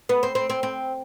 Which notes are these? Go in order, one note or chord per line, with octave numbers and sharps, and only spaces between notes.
B3
C4
C4
C4
C4